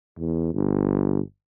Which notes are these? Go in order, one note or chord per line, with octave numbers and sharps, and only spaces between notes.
E2
G1